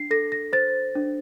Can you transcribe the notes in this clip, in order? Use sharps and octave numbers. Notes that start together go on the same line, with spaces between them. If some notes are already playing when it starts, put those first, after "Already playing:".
Already playing: D4 C7
A4 A#6
A#6
C5 A6
D4